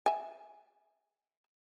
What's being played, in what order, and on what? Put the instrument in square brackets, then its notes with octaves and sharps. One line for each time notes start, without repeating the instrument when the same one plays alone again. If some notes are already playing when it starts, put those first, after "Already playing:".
[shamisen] E5 G#5